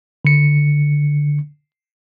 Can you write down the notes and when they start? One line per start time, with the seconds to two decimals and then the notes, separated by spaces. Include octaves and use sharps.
0.25 D3 C#7